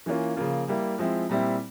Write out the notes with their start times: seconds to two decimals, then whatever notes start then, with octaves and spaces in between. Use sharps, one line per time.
0.06 E3 A#3 C#4 F4
0.36 C#3 F3 A#3 F4
0.68 G3 A#3 E4
0.98 F3 G#3 C4 E4
1.29 A#2 G3 C4 E4